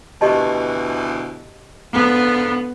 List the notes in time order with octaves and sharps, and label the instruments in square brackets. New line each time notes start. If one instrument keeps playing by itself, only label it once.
[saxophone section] D2 B2 E3 [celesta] G4 D#5 A5
[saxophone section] G#2 D3 F4 [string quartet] B3